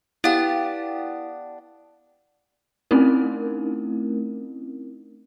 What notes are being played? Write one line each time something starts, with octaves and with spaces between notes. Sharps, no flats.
B3 D4 E4 G4 F5
A3 C4 C#4 D#4 E4 A#4